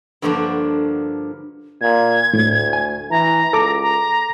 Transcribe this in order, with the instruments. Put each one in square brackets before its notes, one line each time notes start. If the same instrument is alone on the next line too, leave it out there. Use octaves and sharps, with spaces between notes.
[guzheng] G2 D3 F3 A#3 D4 F#4
[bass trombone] A#2 [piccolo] G#6
[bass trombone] D2 [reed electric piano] A2
[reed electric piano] G#5
[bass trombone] E3 [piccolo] A#5
[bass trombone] C#2 [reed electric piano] A4 D6
[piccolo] A#5